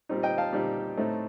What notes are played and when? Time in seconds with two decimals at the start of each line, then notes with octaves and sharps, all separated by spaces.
0.09 A#2 G3 C4 D#4
0.23 D#5 G5
0.38 F5 A5
0.53 A#2 G3 C4 D#4
0.97 A2 A3 C4 D#4